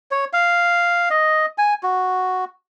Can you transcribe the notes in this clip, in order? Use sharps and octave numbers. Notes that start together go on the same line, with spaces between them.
C#5
F5
D#5
G#5
F#4